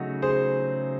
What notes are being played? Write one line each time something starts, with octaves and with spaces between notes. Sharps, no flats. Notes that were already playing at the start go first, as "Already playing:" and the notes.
Already playing: C#3 F#3 A3 D#4 F#4
G#4 C5